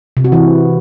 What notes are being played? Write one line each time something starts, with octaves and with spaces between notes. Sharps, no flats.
C3
F#4
E3